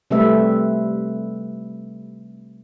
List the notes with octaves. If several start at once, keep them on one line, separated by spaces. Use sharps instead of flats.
C3 G3 A3 C4 B4 E5